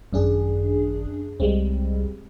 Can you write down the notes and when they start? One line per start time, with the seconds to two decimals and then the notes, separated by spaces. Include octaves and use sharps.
0.13 G#1 F#2 D4 G#4
1.40 C2 G3 G#3 C4